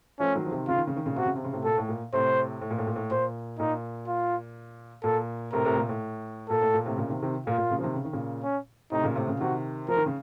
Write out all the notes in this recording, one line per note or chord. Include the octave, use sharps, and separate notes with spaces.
F3 A3 C#4
D#3 F#3
F3
C3 D#3
C#3 F4
D#3
C#3
D#3
A#2 C#3
C3 F#4
C#3
C3
C#3
A2 C3
A#2 A4
A2
A#2
A2 C3 C5
A2
A#2
A2
A#2
A2
A#2 C5
A#2 D#4
F4
A#2 A4
A2 C3 A#4
A2 C3
A#2
A2
A#2 A4
A2
A#2
A2 C3
A#2 C#3
C3 D#3
C3 D#3
A#2 F4
A#2
A#2 C#3
F3
C3 D#3
C#3
D#3
A#2 C#3
C#4
A2 C3 D#4
A#2 C#3
A2 C3
A#2 C#3
C3 D#3 F#4
F3 A#4
D#3
C#3